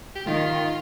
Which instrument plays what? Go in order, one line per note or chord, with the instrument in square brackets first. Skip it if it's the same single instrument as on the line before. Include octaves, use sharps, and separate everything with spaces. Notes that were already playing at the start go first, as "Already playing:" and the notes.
[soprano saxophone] G4
[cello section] D#3 [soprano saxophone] F4